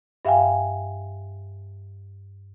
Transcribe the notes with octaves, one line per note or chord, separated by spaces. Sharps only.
G2 E5 F5 G5 G#5